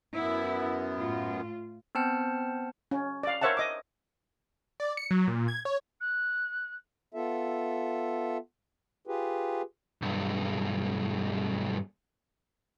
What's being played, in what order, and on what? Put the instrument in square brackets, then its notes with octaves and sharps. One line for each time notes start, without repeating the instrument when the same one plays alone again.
[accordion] F#2 B3 [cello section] E4
[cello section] A2 F4
[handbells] B3 C4 C5 A5 F6 C#7
[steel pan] C#4
D5 F5
A#4 C5 C#5 E5 F#5 A5
D#5 D6
[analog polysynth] D5
C#7
F#3
A#2
G#6
C#5
[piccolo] F#6
[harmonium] B3 F4 A4 E5
F4 G4 G#4 B4
[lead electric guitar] B1 G2